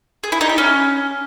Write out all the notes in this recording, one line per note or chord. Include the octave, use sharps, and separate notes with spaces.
G#4
E4
D#4
G4
C#4